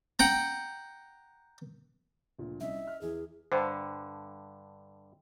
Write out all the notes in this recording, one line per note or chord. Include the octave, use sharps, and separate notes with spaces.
F#5 G5 A#5
D2 A#2 F3
C2 C#4 D#5 E5
D#5 F6
E2 E3 G#4
G2 D3 C5